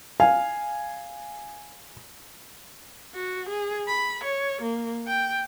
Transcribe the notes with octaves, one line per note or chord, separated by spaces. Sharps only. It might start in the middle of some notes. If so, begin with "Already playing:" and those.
F5 G#5
F#4
G#4
B5
C#5
A#3
G5